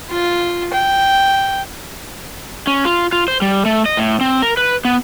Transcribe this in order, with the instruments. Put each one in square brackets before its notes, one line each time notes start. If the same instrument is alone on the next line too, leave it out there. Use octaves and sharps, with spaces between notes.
[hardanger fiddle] F4
G5
[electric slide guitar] C#4
F4
F4
C5
G3
A3
D#5
A2
C4
A#4
B4
B3